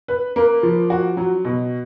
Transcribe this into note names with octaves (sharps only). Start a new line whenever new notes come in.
B4
A#3
F3
F#4
F#3
B2